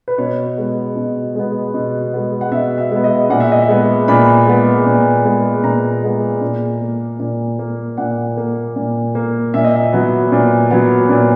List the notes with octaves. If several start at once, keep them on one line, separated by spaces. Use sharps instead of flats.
B4
B2 C#5
G#3 B3
B2
G#3 B3
B2
G#3 B3
F#5
B2 E5
E5
G#3 B3
D#5
A#2 F#5
E5
D#5
E5
G#3 B3
A#2 B5
G#3 B3
A#2
G#3 B3
A#2 A#5
G#3 B3
A#2
A#3
A#2
A#3
A#2 F#5
A#3
A#2
A#3
A#2 E5
D#5
E5
F#3 B3
A#2
F#3 B3
A#2